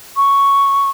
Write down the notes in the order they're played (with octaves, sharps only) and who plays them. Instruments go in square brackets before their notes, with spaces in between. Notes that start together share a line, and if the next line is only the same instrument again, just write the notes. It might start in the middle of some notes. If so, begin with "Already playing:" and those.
[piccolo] C#6